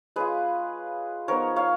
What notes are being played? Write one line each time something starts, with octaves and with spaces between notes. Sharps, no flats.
G#3 C#4 F4 G#4 B4
F3 B3 D#4 A#4 C#5
C#5 F5